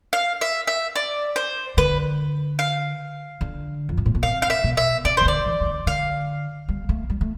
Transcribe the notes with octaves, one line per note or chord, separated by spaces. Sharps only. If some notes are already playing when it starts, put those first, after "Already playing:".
F5
E5
E5
D5
C5
D3 B4
F5
D3
F2
G2
A2
B2
C3 F5
F5
E5
B2
E5
C3 D5
C3 C5
D3 D5
E3
E3
D3
D3 F5
G3
A3
G3
A3